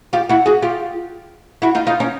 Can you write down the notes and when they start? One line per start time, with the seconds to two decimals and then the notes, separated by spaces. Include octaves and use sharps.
0.13 F4 G4
0.29 E4 F#4
0.46 F#4 G#4
0.62 F4 G4
1.62 E4 F#4
1.75 D#4 F4
1.87 D#4 F4
2.00 C#4 D#4